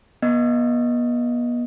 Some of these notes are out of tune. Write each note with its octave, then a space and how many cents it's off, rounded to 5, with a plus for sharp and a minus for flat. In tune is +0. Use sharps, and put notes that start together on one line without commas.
B3 -40 D#5 +0